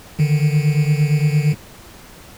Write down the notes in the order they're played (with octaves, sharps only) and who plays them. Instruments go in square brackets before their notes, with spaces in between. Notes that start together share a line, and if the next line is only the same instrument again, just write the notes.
[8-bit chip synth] D3 D#3